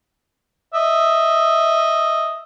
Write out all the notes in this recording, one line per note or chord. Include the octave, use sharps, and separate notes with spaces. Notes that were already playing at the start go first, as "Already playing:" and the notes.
D#5 E5